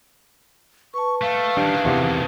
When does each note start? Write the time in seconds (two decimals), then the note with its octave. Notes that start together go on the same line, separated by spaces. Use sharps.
0.94 B4 A5 C#6
1.22 A3 F5
1.57 D#3 E3 G3 D4
1.85 E2 C3